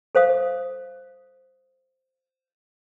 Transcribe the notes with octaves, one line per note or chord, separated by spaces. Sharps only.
A4 C5 F5 D#6